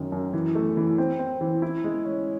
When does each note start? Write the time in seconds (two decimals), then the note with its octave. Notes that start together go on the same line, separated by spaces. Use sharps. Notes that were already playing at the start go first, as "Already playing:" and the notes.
Already playing: F#2 D#3
0.12 F#2
0.33 E3
0.55 A3
0.77 E3
0.98 C4
1.19 C4
1.41 E3
1.62 E4
1.84 G#3
2.05 C#4